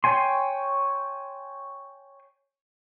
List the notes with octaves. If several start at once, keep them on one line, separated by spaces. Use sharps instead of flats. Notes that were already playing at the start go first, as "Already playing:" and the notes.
C#5 G5 G#5 C6